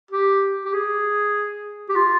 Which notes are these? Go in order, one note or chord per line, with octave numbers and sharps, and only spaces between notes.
G4
G4
G#4
G4
F4